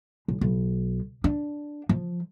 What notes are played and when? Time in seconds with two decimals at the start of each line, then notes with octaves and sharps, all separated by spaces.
0.28 B1
0.41 B1
1.24 D4
1.89 F3